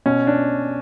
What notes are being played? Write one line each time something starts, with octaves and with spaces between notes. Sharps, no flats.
B2 C#4
D4